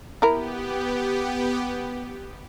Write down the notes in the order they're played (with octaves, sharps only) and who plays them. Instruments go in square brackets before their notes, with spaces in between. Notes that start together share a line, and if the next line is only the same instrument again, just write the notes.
[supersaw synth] B3 G4 [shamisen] E4 A#4